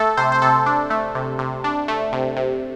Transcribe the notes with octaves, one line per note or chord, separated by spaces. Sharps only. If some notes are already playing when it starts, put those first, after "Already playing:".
Already playing: A3 A4
C3 C5
C5
C3 A4
D4
A3
C3
C3
D4
A3
C3
C3